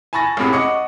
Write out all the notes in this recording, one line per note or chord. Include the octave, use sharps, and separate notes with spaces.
G#5 A5 B5 C#6 A6 A#6
A1 A2 C3 G#4
D#5 F#5 C#6 D6 C#7